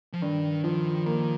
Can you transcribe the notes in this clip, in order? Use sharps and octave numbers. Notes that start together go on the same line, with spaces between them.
F3
G2 D#3
D#3 F3
D#3 A#3